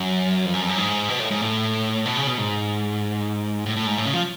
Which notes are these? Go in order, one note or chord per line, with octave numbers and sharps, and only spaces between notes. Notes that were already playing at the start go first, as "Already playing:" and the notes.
Already playing: F#2
F2
F#2
F2
F#2
G#2
B2
A2
G#2
A2
B2
C#3
B2
G#2
A2
A2
G#2
A2
C#3
F3